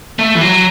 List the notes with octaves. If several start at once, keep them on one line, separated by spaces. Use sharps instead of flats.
A3
E3
F#3